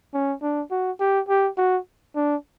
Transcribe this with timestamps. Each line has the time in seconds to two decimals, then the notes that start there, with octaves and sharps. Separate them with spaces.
0.14 C#4
0.42 D4
0.71 F#4
1.00 G4
1.29 G4
1.58 F#4
2.16 D4